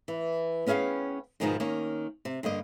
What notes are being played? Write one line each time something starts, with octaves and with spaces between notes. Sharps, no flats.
E3
B3 C#4 G#4 E5 F5 G5
G#2 B2 D#3 F3 G#3 D#4
D#3 A#3 C#4
C3
G2 D3 A#3 D#5